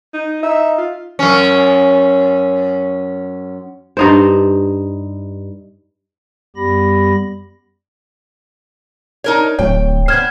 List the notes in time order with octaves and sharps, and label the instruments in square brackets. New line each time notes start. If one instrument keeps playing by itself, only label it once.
[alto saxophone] D#4
[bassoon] D#4 [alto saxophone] E5
[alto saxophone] F4
[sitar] F#2 C#4
[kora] G2 D#4 C5
[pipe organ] F#2 G3 B3 G4 B5 A#6
[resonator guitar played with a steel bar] D#4 A#4 C#5
[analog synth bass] D1 [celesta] C#5 [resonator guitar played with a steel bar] G5
[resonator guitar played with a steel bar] B3 C5 [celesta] F6 G#6